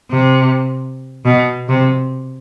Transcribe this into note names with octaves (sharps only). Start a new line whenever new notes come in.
C3
B2
C3